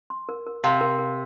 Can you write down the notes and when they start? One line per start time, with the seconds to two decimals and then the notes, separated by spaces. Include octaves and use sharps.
0.10 C6
0.29 A#4
0.46 A#4
0.64 C3 F5
0.81 A#4
0.99 A#4